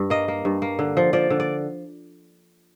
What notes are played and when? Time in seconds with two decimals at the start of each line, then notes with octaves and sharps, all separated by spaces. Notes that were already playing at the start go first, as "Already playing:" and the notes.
Already playing: G2
0.10 A#3 D#5
0.28 A#3
0.45 G2
0.62 A#3
0.79 D3
0.97 F3
1.13 F3 D5
1.30 D3
1.40 D5